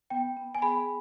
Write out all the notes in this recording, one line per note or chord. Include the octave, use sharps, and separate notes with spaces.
B3 G5
B3
G#5
G#4 B5